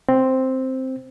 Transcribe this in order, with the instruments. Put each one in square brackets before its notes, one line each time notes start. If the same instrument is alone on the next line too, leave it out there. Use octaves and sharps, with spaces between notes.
[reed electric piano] C4